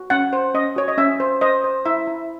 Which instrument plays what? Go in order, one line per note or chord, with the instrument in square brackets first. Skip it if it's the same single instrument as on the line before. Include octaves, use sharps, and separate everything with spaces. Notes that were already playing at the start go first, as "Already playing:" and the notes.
Already playing: [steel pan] F#4
C#4 F#5
C5
C#4 D#5
F#4 C#5
D#5
C#4 E5
C5
C5 D#5
C5
E4 E5
E4